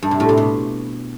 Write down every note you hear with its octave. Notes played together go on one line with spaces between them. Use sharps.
G2
C3
A2
C3
B2